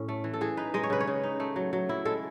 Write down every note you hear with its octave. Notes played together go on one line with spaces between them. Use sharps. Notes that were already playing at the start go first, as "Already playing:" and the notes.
Already playing: A2 C#4
A3
E3
A4
E3 G#4
D#4 B4
G#3 D#5
C#5
C#3 B4
C#5
C#3
D#4
A3
F#3
F#3
E4
G#3 A4